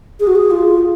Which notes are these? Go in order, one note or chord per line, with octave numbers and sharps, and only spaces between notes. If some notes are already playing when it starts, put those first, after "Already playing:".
G#4
F#4
G#4
F4